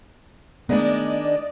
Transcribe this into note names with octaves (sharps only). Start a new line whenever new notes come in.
D#3 G#3 A3 B3 D4 D5 D#5